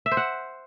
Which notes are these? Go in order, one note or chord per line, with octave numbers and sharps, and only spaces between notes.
E5
C5
F#5